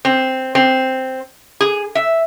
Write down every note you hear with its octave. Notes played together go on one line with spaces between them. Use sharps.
C4
C4
G#4
E5